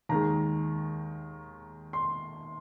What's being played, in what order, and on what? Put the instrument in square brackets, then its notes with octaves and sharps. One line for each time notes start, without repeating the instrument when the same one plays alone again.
[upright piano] D#2 D#3 G#3 A#5
C6